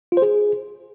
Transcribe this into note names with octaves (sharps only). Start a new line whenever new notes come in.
F4
C5
G#4